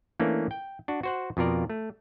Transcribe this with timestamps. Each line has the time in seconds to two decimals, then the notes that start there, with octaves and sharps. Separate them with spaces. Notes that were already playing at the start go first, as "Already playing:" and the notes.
0.20 E3 A3 A#3 C#4 D4
0.51 G5
0.88 D4 F#4
1.03 F#4 C5 F#5
1.37 F2 B2 F4 A#4 D5
1.70 A3